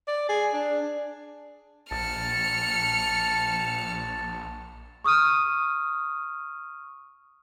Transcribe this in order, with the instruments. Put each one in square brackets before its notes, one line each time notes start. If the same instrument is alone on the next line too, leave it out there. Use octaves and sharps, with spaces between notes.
[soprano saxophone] D5
G#4
D4
[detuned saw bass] A#1 [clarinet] A5 [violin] F6 C#7
[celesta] C#6 D#6 F6 D#7